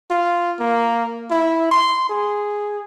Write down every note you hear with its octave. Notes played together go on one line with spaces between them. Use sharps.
F4
A#3
E4
C6
G#4